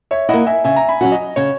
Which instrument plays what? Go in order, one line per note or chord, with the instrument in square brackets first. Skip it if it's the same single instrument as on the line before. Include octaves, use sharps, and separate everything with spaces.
[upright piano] C#5 E5
[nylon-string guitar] A#3 E4 [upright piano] D#5 F#5
[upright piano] E5 G#5
[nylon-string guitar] C#3 [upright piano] E5 G#5
[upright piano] A#5
G#5 B5
[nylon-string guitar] F#3 C#4 F#4
[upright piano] D#5
[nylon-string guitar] C#3 [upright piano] C#5